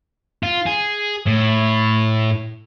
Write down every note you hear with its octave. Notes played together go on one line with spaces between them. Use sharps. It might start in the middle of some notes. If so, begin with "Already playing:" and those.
F4
G#4
A2